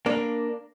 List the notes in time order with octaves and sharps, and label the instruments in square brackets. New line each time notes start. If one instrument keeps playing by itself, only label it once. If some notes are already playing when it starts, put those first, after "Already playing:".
[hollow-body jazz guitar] A#3 D4